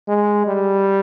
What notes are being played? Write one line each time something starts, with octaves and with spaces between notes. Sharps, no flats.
G#3
G3